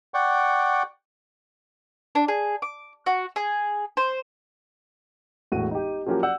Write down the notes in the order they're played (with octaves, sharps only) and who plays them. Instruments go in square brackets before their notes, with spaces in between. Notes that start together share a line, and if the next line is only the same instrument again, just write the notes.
[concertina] D5 F#5 G5 C#6
[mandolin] D4
G#4
D6
F#4
G#4
C5
[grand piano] E1 A2 F#4 D#7
D#4 G4
F3 F#3 A#3 C#4 F#4 G4
D5 F#5 E6 G6